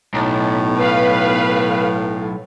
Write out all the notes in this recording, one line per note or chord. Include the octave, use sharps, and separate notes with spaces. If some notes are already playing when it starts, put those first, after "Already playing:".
B1 A2
B4 F5